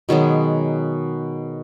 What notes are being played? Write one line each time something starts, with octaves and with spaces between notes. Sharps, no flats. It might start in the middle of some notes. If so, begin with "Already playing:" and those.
B2 D#3 F#3 G#3